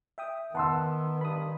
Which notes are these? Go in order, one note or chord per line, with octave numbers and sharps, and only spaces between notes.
E5 G5 D#6
D#3 B3 F#5 A5 C6 E6
G2 B5 D#6